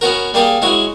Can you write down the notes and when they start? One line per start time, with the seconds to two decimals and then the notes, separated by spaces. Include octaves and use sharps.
0.01 B3 C#4 F#4 A#4
0.34 G3 A#3 G4 G#4
0.62 G#3 C#4 E4 F#4